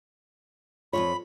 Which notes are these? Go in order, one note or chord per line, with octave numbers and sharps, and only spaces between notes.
F2 A#2 F4 C#5 B5